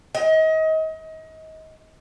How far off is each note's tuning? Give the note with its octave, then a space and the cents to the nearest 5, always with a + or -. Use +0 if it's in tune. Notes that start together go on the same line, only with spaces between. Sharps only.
D#5 +30